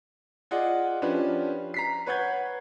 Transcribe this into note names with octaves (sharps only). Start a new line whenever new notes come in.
F4 G#4 D5 D#5 F#5
F3 C#4 D4 F4 G4 B4
A#5 B6 C7
B4 C#5 F#5 G6 G#6